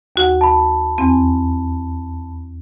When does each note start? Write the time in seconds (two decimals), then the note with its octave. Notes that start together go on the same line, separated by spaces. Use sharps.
0.16 D#2 F#4 F#5
0.41 A5 B5
0.98 E2 C4 G#5